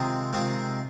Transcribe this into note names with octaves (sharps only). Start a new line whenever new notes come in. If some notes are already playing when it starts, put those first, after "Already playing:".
Already playing: C3 D#3 G#3 C4 F4
C3 D#3 G#3 C4 F4